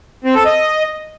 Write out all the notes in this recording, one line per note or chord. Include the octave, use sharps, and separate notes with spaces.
C4
A4
D#5